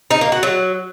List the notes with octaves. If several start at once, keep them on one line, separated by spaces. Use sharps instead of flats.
D#4
A#3
F#4
F#3